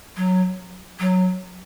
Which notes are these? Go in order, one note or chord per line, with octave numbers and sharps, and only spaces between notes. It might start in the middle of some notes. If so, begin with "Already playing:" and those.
F#3
F#3